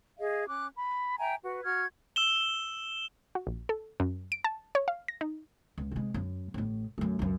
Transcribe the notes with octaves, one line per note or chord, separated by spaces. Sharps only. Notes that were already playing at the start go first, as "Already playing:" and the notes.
G#4 D#5 F5
C#4 D6 F#6
B5
E5 G5 G#5 A#5
F#4 B4
F#4 F6 G#6
E6 E7 G7
F#4
A#1
A4
F#2
D7
A5
C#5
F5
A#6
D#4
C#2
C3 G#3
F#2
A1 A2
F#2 A3
C#2 F#2